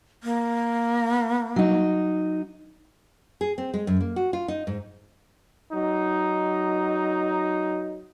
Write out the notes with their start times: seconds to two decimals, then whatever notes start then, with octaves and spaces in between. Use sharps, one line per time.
0.23 A#3
1.56 F#3 D#4
3.41 G#4
3.58 C4
3.74 G#3
3.87 F#2
4.01 A#3
4.16 F#4
4.33 F4
4.48 D#4
4.67 G#2
5.72 F#3 D#4